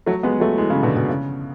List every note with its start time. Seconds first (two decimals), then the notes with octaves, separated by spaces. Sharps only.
0.06 F#3 A3
0.23 G#3 B3
0.40 F#3 A3
0.57 E3 G#3
0.70 C#3 E3
0.83 B2 D3
0.97 B2
1.09 C#3